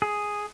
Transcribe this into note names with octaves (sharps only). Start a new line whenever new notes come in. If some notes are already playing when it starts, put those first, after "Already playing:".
G#4